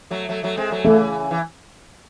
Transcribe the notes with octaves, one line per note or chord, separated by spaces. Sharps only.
F#3 A3
F#3 A3
F#3 A3
G#3 C4
F#3 A3
C#3 E3 A3
E3